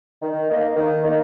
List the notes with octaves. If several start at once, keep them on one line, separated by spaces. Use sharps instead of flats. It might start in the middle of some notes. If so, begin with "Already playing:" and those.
D#3
A#3 D#4
D#3
A#3 D#4